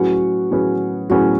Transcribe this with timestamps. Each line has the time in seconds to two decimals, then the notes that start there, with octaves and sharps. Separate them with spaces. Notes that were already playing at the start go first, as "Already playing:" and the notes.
Already playing: A2 F#3 C#4 F#4 G#4 B4
0.51 A2 F#3 C#4 G#4 B4
1.10 A2 F#3 C#4 F#4 G#4 B4